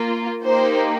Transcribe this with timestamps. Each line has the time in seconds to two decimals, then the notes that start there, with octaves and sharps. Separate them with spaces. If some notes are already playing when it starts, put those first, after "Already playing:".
Already playing: A#3 F4
0.45 A#3 D#4 G4 C5